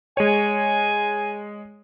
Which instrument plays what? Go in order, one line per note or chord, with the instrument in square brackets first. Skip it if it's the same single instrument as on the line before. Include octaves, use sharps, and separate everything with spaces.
[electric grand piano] G#3 C#5 [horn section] G#5